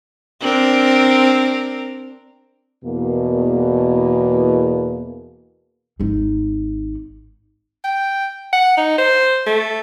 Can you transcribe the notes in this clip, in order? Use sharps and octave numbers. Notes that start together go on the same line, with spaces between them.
C4 D4 A#4
E2 B2 A#3
G#1 D#4
G5
F#5
D#4
C5
A3